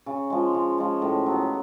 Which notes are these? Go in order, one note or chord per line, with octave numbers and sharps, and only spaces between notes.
C#3
F3 G#3
C#3
F3 G#3
A2
F#3 B3